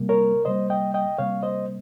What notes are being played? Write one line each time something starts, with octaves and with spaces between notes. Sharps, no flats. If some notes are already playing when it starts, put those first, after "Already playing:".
Already playing: C3 G3 A#3
A#4 C#5
C3 G3 A#3 C5 D#5
D#5 G5
D#5 G5
C3 G3 A#3 C#5 F5
C5 D#5